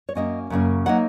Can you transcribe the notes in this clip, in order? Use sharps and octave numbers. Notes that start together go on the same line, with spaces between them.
C#5
F#2 C#3 A#3 C#4 D#5
F#2 C#3 A#3 C#4
F#3 A#3 D#4 F#5